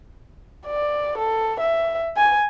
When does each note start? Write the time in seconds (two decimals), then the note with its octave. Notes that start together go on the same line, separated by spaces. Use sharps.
0.67 D5
1.18 A4
1.60 E5
2.17 G#5